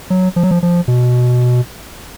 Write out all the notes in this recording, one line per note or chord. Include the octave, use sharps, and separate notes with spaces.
F#3
F3
F#3
F3
F3
B2